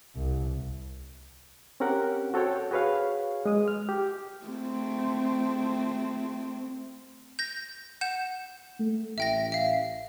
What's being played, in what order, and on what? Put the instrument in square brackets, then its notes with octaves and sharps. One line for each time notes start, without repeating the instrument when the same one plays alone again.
[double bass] C2
[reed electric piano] C4 C#4 G4 A#4 F#5 G5
F#4 A4 C5 C#5 G5
F#4 G#4 B4 C#5 F5
G#3 D#6
F6
G4
[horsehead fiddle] A3 C4
[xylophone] G6 A#6
F#5 G6 E7
[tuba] A3
[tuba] A1 [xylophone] E5 G5 A#6
[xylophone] E5 F5